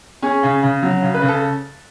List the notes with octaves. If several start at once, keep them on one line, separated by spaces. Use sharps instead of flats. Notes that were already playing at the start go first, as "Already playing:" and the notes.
C#4 G#4
C#3
C#3
F#3
C#3
B4
C#3
A4